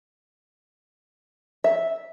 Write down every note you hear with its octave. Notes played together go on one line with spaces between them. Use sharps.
E5